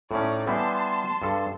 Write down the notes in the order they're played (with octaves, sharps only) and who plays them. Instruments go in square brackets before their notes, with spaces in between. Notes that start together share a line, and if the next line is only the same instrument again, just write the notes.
[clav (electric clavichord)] A2 C#4 [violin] D#4 D5
[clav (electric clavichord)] E3 G3 B3 [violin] A5 C6
[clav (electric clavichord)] G2 A4